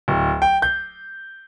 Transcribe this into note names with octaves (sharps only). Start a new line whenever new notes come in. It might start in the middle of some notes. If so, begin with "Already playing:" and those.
D1
G5
G6